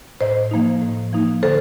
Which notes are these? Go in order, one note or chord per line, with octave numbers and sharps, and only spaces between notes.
A2 C5 D#5
F3 A#3 D#4
A2
F3 A#3 D#4
D3 A4 C5